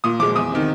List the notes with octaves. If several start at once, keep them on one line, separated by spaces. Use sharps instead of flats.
A#2 D#6
F3 G#3 D6
E2 D#6
C3 D#3